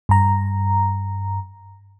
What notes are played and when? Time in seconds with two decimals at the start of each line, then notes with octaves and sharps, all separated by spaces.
0.09 G2 A#5